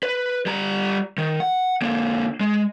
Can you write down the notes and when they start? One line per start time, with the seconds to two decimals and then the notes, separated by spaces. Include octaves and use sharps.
0.03 B4
0.46 G3 A#5
1.18 D#3
1.40 F#5
1.82 D3 A#3
2.40 G#3